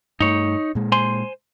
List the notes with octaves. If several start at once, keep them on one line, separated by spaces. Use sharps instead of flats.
G2 A3 D#4 C#5
A#2 G#3
C5 G#5 C6